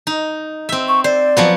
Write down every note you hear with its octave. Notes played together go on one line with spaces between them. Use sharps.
D#4
C4 E5
C#6
C5 D5
F3 F#3 B3